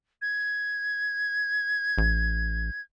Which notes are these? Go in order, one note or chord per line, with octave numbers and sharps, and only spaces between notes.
G#6
A1